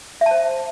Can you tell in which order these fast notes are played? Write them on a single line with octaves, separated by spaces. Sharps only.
E5 A5 C5